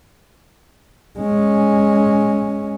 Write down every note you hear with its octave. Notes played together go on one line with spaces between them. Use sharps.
G#3 C#4